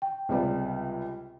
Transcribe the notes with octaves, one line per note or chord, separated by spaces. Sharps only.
G5
C#2 C3 G3